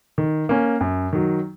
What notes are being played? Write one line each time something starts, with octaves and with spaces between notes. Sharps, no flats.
D#3
A#3 C#4
F#2
D#3 F#3